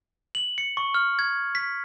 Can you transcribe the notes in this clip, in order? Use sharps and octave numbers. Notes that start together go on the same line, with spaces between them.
F#7
C#7
C#6
F6
G#6
B6